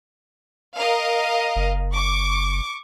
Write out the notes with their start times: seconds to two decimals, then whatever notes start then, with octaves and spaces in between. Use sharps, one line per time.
0.74 A#4 D#5 F5
1.56 F#1
1.93 C#6 D6